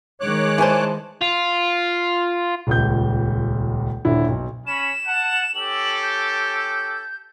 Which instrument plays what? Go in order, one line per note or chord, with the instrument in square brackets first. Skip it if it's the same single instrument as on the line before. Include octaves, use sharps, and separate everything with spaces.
[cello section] D#3 G#3 [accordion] C#5 D6 F#6
[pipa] E3 C5 [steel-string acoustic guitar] D5 G#5 A5
[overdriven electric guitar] F4
[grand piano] D#1 C#2 G6
D#1 D3 E4
B1
[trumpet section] C#4 B5 [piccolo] E7
[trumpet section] F#5 A5
[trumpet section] C#4 G4 A4 [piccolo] F#7
[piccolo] G6